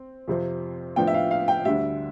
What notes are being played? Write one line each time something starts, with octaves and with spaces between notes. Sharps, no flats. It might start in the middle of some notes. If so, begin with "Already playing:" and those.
Already playing: C4
F2 C3 F3 C4
A2 F3 B3 D4 G5
E5
F5
F5
G5
D2 D3 G3 E5